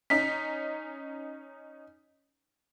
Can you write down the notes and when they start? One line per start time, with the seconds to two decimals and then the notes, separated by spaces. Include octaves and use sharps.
0.10 C#4 D#4 B6